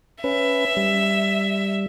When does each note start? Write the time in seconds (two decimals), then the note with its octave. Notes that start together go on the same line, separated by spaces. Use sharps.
0.24 C#4 B4 E5
0.77 G3